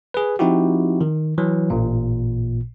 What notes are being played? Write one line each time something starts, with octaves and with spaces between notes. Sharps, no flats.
G#4 B4
F3 C4 D#4 E4 F#4 G4
D#3
E3 F#3
A1 A#2